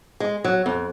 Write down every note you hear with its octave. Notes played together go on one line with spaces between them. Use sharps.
G#3
F#3
F2